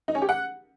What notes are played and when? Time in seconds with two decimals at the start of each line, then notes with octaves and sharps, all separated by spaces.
0.08 D#4
0.15 C#4
0.22 G4
0.29 F#5